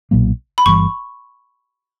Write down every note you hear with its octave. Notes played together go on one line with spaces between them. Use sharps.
B1 A#2 F#3 A#3
B5
G1 G2 E3 C#6